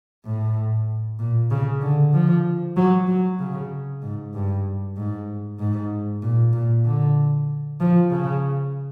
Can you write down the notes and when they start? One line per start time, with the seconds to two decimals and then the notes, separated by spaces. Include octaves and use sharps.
0.25 A2
1.19 A#2
1.51 C#3
1.81 D3
2.13 F3
2.77 F#3
3.07 F#3
3.39 C#3
4.02 G#2
4.34 G2
4.97 G#2
5.59 G#2
6.22 A#2
6.53 A#2
6.85 D3
7.80 F3
8.11 C#3